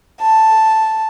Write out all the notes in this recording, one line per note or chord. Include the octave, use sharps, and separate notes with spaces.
A5